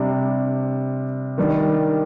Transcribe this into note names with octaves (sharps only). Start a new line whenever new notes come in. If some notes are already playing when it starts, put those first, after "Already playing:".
Already playing: C3 G3 D4
D#3 G3 D4